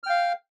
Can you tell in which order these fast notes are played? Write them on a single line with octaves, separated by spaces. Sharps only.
F6 G5 F5